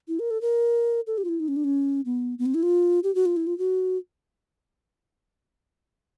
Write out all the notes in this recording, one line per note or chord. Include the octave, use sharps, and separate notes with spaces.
E4
A#4
A4
A#4
A4
G4
F4
E4
D#4
C#4
D4
C#4
B3
B3
C4
E4
F4
G4
F#4
F4
E4
F4
F#4